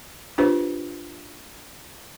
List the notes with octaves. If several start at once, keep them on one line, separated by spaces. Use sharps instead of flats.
D4 F4 G4 B4 C5